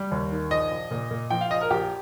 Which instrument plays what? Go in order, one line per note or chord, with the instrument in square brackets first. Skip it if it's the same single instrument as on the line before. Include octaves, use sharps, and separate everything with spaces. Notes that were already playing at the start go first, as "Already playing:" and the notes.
Already playing: [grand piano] G3
D#2
D#3
A#1 D#5
A#1
A#2
A#2
F3 G5
F5
A#1 D#5
A#4
A#1 G4